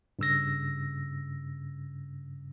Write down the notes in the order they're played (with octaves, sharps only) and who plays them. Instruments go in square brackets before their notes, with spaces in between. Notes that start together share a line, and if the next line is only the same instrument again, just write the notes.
[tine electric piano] G2 C#3 E6 A#6